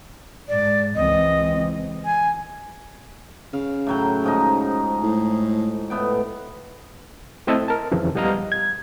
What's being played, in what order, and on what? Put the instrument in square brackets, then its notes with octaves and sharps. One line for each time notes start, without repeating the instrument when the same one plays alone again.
[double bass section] G#2 [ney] D5
[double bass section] C#2 E3 C4 [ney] D#5
[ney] G#5
[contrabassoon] C#3 [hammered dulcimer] F5
[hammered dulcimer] A2 F#3 G5
G#2 F3 D#4
[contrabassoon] A2
[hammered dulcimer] A2 B3 G5
[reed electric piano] A3 C4 E4 D#5 E5 A5
A#4 A5
F2 C#3 E3 F3
C#2 G3 B3 D#5 F5 A#5
G#6